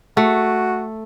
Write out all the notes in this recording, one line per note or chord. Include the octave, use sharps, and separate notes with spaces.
A3 F#4